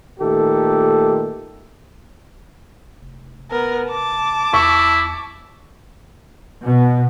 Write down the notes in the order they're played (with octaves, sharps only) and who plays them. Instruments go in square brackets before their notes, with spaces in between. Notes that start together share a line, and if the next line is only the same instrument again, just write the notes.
[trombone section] A#2 D#3 A3 G4 A4
[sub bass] F1
[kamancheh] B3 A#4
A5 D6
[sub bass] E2 [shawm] E4 [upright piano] C#6
[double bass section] B2